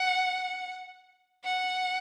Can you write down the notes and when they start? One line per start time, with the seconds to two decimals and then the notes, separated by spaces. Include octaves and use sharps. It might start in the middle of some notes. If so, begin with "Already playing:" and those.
Already playing: F#5
1.44 F#5